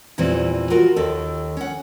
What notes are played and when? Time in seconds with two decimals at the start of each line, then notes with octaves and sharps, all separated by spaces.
0.18 E2 A#2 E3 G3 C4
0.70 F4 F#4 A#4
0.96 D#2 D#3 A4
1.57 C#4 F#5